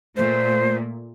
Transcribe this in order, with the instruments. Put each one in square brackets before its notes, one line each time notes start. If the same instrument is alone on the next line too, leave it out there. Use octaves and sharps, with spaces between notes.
[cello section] A#2 A3 [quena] C5